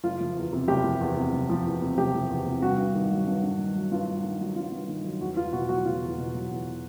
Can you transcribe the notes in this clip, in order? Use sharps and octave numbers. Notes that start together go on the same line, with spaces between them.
F#1 F4
F3
E2
C3
F#1 G4
F3
E2
C3
F#1
F3
E2
C3
F#1 G4
F3
E2
C3
G2 F#4
G2
D#3
F#3
G2
G2
D#3
F#3
G2 F4
G2
D#3
F#3
G2 F4
G2
D#3
F#3
E2 F#4
E2 F4
B2 F#4
F#3 F#4
E2 F4
E2
B2
F#3
E2